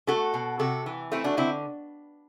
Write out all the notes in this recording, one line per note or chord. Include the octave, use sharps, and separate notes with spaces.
A3 F#4 A4
B2
C3 F#4 A4
E3
A3 C4 E4
D4 F#4
D3 C4 E4